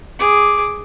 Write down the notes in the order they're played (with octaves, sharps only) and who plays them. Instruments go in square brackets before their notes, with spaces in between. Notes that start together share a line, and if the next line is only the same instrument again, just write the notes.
[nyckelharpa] G#4 D6